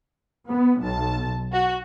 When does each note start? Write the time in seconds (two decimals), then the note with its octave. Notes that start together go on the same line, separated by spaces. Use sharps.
0.48 B3
0.80 B1 A5
1.52 F#4